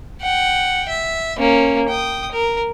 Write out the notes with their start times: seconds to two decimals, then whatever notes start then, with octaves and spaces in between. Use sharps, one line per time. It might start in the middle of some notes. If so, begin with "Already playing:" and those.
0.22 F#5 G5
0.89 E5
1.38 A#3 C#4
1.88 G5 D#6
2.32 A#4